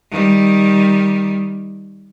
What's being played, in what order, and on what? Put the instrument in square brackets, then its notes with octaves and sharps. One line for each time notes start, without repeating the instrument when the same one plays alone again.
[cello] D#3 G3